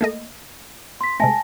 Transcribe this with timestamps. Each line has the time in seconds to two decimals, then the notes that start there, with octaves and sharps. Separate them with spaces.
0.01 A3 A#3 D#5
1.01 C6 B6
1.20 C3 G#3 A3 G#5 A5 A#6